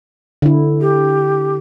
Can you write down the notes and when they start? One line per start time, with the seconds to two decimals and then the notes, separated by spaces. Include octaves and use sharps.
0.42 D3 E4
0.81 G4